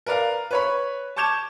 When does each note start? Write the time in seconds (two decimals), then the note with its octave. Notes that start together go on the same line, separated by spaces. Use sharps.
0.06 A#4 B4 D5 F5 A#5
0.51 B4 C#5 B5
1.16 A5 C#6 D6 G6 G#6 E7